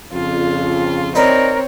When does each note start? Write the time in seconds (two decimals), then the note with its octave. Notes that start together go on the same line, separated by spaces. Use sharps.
0.13 F2 C#3 F4
1.15 C4 D#4 A#4 B4 C#5 D5